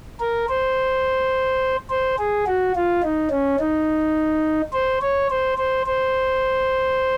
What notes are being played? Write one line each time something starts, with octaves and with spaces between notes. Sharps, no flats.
A#4
C5
C5
G#4
F#4
F4
D#4
C#4
D#4
C5
C#5
C5
C5
C5